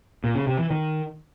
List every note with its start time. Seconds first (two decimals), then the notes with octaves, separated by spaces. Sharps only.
0.24 A#2
0.35 C#3
0.47 C3
0.59 E3
0.71 D#3